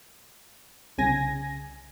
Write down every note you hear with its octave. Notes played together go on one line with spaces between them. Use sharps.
C2 C#3 G#5 A#6